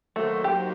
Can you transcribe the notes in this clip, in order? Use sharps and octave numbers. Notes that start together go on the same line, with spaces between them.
D#3 F#3 A3 A#3 F#4 C5
G4